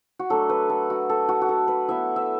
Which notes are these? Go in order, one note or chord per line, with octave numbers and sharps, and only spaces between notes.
F#4
F#3 A3 D4 A4
B4
A4
F#4
A4
F#4
F#4
A4
B4
F#3 B3 E4 E5
E5